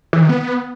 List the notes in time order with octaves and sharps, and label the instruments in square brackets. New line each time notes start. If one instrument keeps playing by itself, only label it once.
[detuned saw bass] E3
D#3
B3